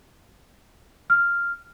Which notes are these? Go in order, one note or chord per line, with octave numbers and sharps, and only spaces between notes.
F6